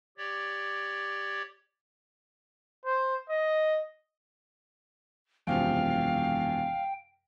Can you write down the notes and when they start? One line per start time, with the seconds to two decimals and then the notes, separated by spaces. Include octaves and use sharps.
0.18 G4 C#5 D5
2.85 C5
3.30 D#5
5.47 E1 F#2 C3 F3 F5 G5